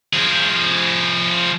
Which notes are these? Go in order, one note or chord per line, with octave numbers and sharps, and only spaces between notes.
F3 G#4